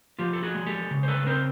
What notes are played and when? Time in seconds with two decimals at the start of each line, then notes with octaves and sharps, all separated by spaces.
0.19 F3 F4 G4
0.33 A4
0.43 F#4 G#4
0.55 G#3
0.67 G4 A4
0.91 C#3
1.03 C5
1.08 A4 B4
1.26 C4 A#4 C5